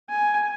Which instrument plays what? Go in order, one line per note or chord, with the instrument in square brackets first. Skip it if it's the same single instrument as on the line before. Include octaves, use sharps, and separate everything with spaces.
[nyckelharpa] G#5